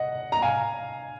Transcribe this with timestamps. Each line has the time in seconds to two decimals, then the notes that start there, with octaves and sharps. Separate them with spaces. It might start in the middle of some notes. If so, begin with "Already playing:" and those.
Already playing: D#5 F#5
0.32 A#5
0.42 F5 G#5